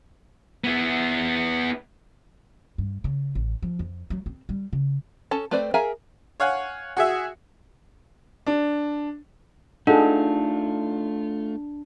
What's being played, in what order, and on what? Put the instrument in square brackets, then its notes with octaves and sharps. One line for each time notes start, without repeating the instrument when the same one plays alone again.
[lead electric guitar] B3 E4
[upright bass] G2
C#3
A1
F3
F2
F#3
C4
G3
C#3
[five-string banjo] C#4 A4 A5
A3 C4 B4 C5 D5
G#4 A#4 E5 F5 G#5
[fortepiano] C#5 F5 F#5 G#5
F#4 G#4 E5
[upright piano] D4
[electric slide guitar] A3 F4 [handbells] D4 [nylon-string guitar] D#4 [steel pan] G#4 A4 F#5